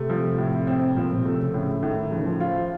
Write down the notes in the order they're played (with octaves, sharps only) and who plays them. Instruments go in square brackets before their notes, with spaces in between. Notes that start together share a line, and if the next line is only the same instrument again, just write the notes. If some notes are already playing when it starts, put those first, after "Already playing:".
Already playing: [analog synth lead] C3 [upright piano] A3
[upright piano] F3
A2
C4
[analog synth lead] A#2 [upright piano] F3
[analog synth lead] C3
[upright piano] A3
[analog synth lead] C#3
[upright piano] A2 [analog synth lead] C#3
[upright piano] A2 [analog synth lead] D#3
[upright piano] C#3 [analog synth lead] F3
[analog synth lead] D#3
F3
[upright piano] F4